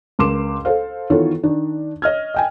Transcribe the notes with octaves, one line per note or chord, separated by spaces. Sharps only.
C#2 A#4 C6 D6 E7
A4 C5 F5
D#3 E3 B3 F4 A4 C#5
D#3 D4
C#5 D#5 F6 G#6
D#5 G5 G#5